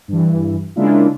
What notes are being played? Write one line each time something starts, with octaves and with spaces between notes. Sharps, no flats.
G2 E3
C#3 G#3 A#3 D4 E4 F4